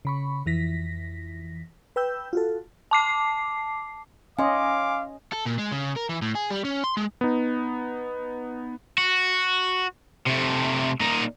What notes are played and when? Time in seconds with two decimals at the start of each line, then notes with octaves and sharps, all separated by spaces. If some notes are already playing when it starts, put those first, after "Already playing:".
0.05 C#3 B5 C#6
0.46 F2 E3 A#6 B6
1.96 B4 G5 E6 G6
2.33 F4 F#4 A4
2.91 A5 D6 C7
4.39 C#4 D#5 F5 G#5 C6 D6
5.32 A4
5.46 A#2
5.58 G#3
5.71 C#3
5.96 A#4
6.09 E3
6.22 A2
6.35 G#4
6.51 G3
6.65 C#4
6.84 C6
6.97 G#3
7.21 B3 D#4
8.98 F#4
10.26 C3 A3
11.01 A#2 D#4